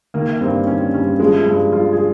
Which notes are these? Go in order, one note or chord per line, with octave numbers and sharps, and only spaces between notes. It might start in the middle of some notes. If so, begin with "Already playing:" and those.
D#3 A#3
G2 C4
D#3 C#4
G2 C#4
F3 G#3
G2
F3 F4
G#4